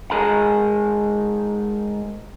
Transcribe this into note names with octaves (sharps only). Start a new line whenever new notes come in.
G#2 G#3 G#4 A#4 B5